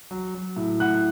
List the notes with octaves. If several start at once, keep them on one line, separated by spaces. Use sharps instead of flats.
F#3
F#3
A2
A2 F#5 F#6